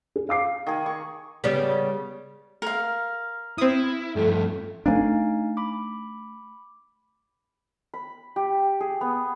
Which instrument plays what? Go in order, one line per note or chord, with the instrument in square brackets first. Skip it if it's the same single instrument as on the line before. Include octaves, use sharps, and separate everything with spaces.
[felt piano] G#4
F5 D6 C7
[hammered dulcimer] D#3 G#4
C#6
[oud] C#3 G3 B3
[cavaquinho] A#4 F5
[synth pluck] C4 D#6 [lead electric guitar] E4
[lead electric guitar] G2 F3 [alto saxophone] A3
[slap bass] A3 B3 D4 [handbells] D#4 F5 G#5
[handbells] B5 D6
[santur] B5
G4
G#4
B3